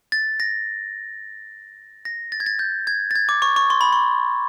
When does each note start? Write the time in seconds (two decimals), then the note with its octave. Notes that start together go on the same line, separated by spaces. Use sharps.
0.12 A6
0.40 A#6
2.05 A#6
2.32 A6
2.40 G#6
2.46 A6
2.59 G6
2.87 G#6
3.11 A6
3.16 G#6
3.29 D6
3.42 C#6
3.56 C#6
3.70 C6
3.81 B5
3.93 C6